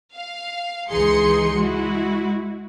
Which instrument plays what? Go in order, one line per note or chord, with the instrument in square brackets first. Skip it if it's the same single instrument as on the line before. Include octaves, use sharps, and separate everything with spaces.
[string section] F5
C#2 E3 D#4 G#4 C6 C#7
G#3 E4 F#4